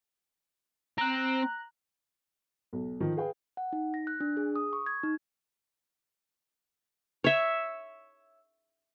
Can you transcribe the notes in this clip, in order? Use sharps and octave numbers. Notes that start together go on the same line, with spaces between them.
C4 A#5 F#6
B1
D#3 F3
G#4 B4 F5 G5
F#5
D#4
A#6
F#6
D4
G#4
D#6
C#6
G#6
D#4
C#5 E5